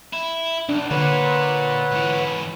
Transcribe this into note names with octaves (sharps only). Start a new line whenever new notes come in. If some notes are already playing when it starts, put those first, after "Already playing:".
E4
B1 D4
A#2 D3 B4 C#5 F#5
G#2 E3